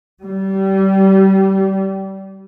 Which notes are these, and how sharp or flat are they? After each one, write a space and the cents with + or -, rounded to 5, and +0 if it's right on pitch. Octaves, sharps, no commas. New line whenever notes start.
G3 -25